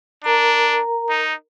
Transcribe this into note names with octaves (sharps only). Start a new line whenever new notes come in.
D4 A#4 A#5
D#4